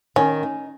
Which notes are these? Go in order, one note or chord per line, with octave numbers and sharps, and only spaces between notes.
D#3 C#4
D#4